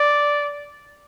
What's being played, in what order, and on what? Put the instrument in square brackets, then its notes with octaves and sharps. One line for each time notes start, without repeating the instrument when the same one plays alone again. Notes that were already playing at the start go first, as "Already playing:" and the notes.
Already playing: [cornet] D5